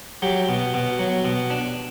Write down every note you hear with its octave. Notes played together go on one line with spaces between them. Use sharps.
F#3 G4
B2
B2
F#3
B2
D4